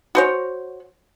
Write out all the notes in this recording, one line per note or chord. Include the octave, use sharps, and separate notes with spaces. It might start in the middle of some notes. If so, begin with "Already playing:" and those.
F#4 C5 C#5